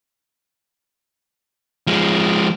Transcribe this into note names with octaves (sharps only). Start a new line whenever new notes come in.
F3 G#3